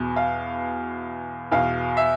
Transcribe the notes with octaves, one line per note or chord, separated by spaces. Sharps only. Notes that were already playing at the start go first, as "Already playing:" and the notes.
Already playing: E2 B2
F5
E2 B2 F5
E5